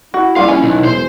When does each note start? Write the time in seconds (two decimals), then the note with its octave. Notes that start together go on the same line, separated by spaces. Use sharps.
0.14 E4 F#4
0.36 A#1 G3 F4 F5
0.48 C#4 G#5
0.63 B1 D#3
0.85 E1 C5 C6